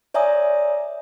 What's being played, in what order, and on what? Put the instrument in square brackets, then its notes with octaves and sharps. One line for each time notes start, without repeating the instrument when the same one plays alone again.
[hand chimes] C#5 D5 E5 G#5 A#5 D#6